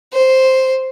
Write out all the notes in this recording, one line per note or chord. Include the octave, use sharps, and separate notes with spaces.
C5